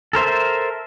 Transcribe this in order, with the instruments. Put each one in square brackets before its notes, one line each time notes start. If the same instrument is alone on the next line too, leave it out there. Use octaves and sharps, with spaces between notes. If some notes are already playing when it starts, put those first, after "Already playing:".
[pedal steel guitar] A4 A#4 C5 E5